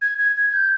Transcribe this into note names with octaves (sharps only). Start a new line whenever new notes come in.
G#6
G#6
G#6
G6